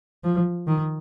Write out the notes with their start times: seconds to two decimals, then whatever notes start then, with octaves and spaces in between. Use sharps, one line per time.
0.24 F3
0.67 D#3